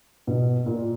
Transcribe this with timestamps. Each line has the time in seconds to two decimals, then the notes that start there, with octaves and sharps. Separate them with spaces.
0.27 B2
0.66 A#2